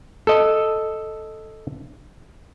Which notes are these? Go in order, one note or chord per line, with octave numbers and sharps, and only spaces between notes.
A4 D#5